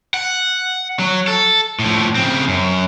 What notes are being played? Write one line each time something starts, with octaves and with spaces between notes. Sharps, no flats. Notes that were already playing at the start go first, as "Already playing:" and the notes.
F#5
F#3
A4
A2 F3
C#3 C4
F#2